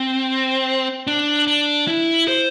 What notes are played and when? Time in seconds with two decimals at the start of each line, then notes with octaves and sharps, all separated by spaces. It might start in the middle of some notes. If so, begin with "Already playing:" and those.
Already playing: C4
1.07 D4
1.47 D4
1.88 E4
2.28 C5